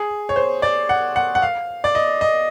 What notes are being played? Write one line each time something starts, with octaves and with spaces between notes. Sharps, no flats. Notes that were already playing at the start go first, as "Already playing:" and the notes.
Already playing: G#4
C#5
C5
D5
F#5
F#5
F#5
F5
D5
D#5
D#5